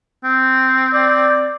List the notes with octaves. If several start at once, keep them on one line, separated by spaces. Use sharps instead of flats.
C4
D5